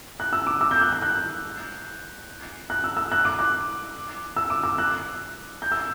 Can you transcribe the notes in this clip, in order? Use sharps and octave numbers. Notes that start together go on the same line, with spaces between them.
F#6
E6
D6
E6
G6
F#6
G6
F#6
F#6
E6
E6
F#6
D6
F#6
E6
D6
E6
F#6
G6
E6